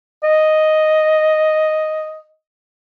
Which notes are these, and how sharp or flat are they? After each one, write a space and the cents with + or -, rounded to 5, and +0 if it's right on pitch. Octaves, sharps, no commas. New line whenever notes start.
D#5 +0